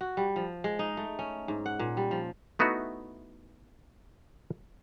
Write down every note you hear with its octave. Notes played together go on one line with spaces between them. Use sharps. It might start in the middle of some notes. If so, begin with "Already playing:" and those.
F#4
G3
F3
G#3
D#4
A3
C#4
G#2
F#5
A#2
G3
F3
A3 B3 D#4 E4 F#4